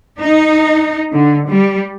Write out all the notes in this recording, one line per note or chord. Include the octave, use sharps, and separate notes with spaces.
D#4
D3
G3